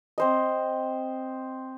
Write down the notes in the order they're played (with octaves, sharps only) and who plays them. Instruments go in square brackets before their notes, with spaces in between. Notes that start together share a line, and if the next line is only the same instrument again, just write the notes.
[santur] C4 C5 D#5